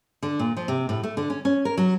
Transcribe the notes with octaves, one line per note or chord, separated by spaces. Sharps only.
D3
A#2
F3
C3
A2
A3
D3
C#4
C#4
A#4
F#3